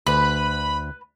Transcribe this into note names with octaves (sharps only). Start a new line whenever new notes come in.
D2 B4 B5